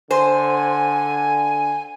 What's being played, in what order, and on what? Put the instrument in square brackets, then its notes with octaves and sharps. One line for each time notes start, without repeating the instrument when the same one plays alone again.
[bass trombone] D3 [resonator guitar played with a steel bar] C5 [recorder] G#5